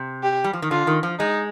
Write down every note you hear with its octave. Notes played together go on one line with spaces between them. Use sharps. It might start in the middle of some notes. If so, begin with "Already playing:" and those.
Already playing: C3
G4
G3
F3
D#3
D3 F4
D#3
F3
G#3 D#4